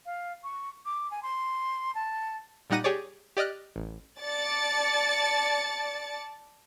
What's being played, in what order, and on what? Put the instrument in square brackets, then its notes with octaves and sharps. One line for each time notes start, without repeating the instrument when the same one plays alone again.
[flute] F5
C#6
D6
G#5
C6
A5
[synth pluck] A#2 G3 D#4 F#5 A#6 D#7
G4 G#4 C#5 D5
G4 D5 D#5 F6 F#6
A1
[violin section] D5 A5 A6 C#7